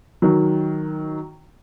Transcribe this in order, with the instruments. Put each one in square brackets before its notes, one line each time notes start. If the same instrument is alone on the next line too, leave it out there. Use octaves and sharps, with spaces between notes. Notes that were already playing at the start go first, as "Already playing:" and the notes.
[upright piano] D#3 F#3